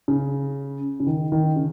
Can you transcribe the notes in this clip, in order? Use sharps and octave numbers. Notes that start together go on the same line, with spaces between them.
C#3
C#3
D#3
D#3
C#3